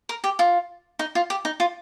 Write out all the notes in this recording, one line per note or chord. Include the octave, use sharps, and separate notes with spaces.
A#4
G4
F4
D#4
F4
G4
D#4
F4